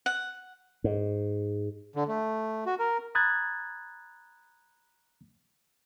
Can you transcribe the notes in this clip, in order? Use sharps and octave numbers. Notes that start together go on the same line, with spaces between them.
F#5
G#2
D3
A3
F#4
A#4
A#5 B5 D#6 F#6 G#6 A6